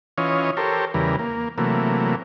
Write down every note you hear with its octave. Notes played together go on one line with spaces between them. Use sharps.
E3 C#4 F4 C#5 D#5
G4 A4 A#4 C5 C#5
E2 C#3 E3 G3 A#4
A#3
C3 E3 F#3 A3 A#3